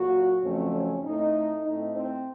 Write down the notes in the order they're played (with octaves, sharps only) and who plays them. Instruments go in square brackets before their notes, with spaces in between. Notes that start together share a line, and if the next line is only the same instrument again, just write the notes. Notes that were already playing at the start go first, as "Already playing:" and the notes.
Already playing: [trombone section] A#2 F#3 A#3 F#4
F2 C#3 F#3 A3 C4 C#4
C#4
A2 A3 C4 D#4
A2 A3 C4 D#4
C4